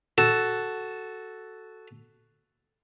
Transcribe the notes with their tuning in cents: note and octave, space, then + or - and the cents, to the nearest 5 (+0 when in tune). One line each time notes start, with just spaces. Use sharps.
F#4 +5 A4 +0